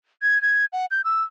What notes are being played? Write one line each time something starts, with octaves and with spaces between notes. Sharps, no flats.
G#6
G#6
F#5
G6
E6